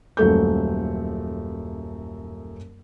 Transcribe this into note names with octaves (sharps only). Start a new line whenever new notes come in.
D#1 F#2 A3 G6